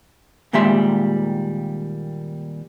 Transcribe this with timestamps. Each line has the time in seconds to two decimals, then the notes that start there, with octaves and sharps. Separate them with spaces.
0.53 D#2 A#2 G3 G#3 E5 C6